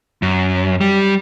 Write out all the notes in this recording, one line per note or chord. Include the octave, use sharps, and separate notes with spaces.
F#2
G3